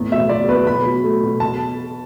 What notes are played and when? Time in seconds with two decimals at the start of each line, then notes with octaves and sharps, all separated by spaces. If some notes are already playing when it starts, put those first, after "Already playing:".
Already playing: E2 A2
0.11 B2 E5
0.29 F#3 D5
0.48 E2 B4
0.67 B2 B5
0.85 F#3
1.03 A3
1.23 B2
1.40 A5